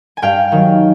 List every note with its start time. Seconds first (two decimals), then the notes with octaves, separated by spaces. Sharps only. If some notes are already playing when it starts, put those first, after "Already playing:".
0.17 G#5
0.22 G2 F5 G5
0.52 D#3 F#3